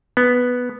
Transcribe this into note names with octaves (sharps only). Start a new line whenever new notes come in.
B3